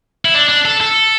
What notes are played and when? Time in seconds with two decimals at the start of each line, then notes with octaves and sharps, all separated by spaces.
0.25 E4
0.34 D4
0.49 D4
0.65 A4
0.81 A4